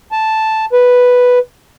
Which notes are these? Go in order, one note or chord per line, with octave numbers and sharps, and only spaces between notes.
A5
B4